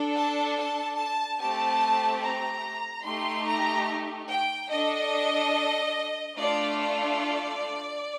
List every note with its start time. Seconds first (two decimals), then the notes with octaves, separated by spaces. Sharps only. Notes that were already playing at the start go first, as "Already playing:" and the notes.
Already playing: D4 A4
0.15 A5
0.57 A5
0.98 A5
1.39 A3 C4 G4 A5
2.22 A#5
3.05 A3 D#4 G4 C6
3.48 A#5
4.30 G5
4.71 D4 A4 D#5
6.38 A3 D4 F4 A4 D5
6.79 D5